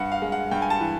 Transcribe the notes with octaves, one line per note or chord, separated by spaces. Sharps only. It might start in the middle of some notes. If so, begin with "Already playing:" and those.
Already playing: G2 F#5
F5
G#3
F#5
G2 G5
G#5
A5
E3